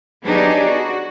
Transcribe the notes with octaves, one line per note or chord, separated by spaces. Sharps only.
F#3 B3 D4 D#4 G4 G#4
F#4